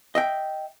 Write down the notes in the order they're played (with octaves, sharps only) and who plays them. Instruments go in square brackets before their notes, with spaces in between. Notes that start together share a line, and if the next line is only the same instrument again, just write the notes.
[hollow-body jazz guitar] D#5 E5 G5